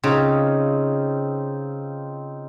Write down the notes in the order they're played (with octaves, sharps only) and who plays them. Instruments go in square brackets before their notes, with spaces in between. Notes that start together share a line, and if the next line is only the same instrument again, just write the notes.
[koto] C#3 [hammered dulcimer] C4 D#4 F4